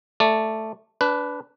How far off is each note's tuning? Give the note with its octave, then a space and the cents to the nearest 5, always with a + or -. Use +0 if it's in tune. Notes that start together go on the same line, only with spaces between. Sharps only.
A3 +0 D5 +0
D4 -20 B4 +5